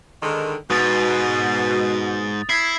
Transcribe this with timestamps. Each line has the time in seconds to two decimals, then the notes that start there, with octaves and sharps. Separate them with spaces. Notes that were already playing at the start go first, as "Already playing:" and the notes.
0.22 G#2 D3 D#3
0.70 G#2 B2 D#6 A6
2.49 E4 G#6 B6 C7